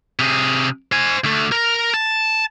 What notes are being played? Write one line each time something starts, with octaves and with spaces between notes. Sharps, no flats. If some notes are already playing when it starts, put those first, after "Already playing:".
C3 G#4
C5 G#5
D2 A3
A#4
A5